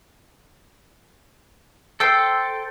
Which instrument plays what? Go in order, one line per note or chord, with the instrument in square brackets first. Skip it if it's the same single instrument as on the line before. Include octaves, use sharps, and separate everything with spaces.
[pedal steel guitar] A4 G5 [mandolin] C5 E6